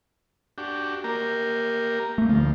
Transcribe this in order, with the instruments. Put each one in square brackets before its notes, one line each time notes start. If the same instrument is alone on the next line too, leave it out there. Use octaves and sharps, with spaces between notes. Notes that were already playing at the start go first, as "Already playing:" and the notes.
[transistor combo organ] D4 F#4 G4
A#3 G4 A#4
[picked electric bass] A3 A#3
[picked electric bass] D2 [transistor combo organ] F3